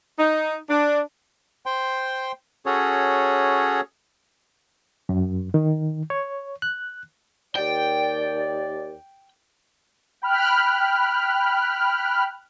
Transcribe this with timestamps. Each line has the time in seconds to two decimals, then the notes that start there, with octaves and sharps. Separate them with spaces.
0.19 D#4
0.69 D4
1.66 C5 G5 C6
2.66 C#4 F#4 G#4 A4 C#5
5.09 F#2
5.54 D#3
6.10 C#5
6.62 F#6
7.56 D#2 D5 G5
10.22 G5 B5 F6 F#6